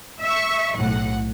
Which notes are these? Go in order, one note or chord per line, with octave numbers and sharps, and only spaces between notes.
E5 C#6
B1 A2 F#5